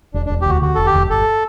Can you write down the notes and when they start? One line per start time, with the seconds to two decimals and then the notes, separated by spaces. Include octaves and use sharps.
0.14 E1 D4
0.26 D4
0.30 E1
0.41 G4
0.46 D2 F#4
0.62 D3 F#4
0.75 E1 A4
0.86 G4
0.94 E1
1.10 G1 A4